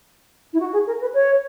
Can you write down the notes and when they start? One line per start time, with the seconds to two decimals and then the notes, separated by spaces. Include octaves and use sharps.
0.53 E4
0.59 F#4
0.72 G#4
0.86 A#4
1.01 B4
1.13 C#5